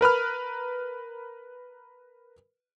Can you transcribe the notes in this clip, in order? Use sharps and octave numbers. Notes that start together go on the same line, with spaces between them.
A#4 B4 B5 F6